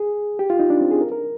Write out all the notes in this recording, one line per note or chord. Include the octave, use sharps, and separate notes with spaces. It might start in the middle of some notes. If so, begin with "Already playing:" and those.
Already playing: G#4
G4
F4
D#4
D4
C4
G#4
A#4
A#4